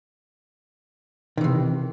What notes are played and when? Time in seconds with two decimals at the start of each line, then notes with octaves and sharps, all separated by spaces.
1.38 D#3
1.41 E3
1.44 C3